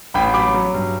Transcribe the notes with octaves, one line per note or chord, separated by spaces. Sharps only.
A1 G5 B5
F#3 B5 D6
F#3
G2